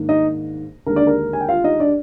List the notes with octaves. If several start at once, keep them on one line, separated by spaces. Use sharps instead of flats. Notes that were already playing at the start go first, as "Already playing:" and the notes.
Already playing: G#2 D#3 A#3 D4
D#4 D#5
D#2 D3 G#3 A#4
D4 D5
A#4
G#5
G5
F4 F5
D#4 D#5
D4 D5